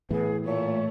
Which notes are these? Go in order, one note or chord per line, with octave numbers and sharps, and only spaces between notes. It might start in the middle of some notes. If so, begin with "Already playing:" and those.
A2 E3 B3 G#4
A#2 A3 C#5